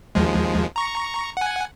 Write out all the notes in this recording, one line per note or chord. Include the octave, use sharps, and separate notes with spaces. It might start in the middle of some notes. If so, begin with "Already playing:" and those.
D#2 F3 G#3
A#5 C#6
F#5 G#5